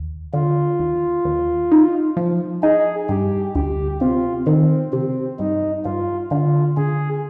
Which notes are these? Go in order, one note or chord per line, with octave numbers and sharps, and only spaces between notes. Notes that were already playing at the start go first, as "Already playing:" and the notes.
Already playing: D#2
D3 F4
D#2
D#2
D#4
F3
D#4 G#4
G2 G4
D2 G4
C3 F4
D#3 C4
C3 C4
G2 D#4
G2 F4
D3 F4
D3 G#4